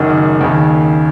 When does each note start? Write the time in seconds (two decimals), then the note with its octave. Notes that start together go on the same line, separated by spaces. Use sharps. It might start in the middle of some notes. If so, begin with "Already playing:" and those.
Already playing: F#1 F#2 D#3
0.41 D#2 C#3